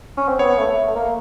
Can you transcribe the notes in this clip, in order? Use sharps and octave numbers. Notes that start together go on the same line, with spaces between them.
C#4
C4
B3 C#5
A3
A3
A#3